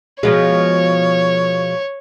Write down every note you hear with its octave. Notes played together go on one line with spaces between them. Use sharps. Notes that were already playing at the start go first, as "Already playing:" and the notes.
B2 F3 G#3 C#5